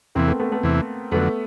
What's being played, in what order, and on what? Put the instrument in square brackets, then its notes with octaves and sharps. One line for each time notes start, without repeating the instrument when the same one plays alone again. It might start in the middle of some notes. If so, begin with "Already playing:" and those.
[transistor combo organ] E2 C3 E3 [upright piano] A#3 C4
[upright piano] A3 B3
A3 B3
A3 B3
[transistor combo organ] E2 C3 E3
[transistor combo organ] F2 D3 F#3 [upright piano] A3 B3